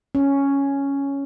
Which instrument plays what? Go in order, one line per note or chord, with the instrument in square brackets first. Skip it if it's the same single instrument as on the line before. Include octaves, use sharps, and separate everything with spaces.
[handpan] C#4